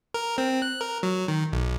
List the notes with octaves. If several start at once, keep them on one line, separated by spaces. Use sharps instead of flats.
A#4
C4
F#6
A#4
F#3
D#3
B1